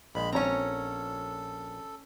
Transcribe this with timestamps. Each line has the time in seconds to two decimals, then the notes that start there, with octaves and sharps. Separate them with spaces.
0.15 A#1 G#3 B5
0.33 C4 C#4 A4 C#5 A#5